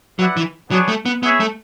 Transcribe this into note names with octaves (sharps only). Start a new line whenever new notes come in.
F#3 E4 B4 D5 F#5
E3
F#3 B3 D4 G#4 C#5
A3
B3
B3 E4 G#4 C#5 E5
A3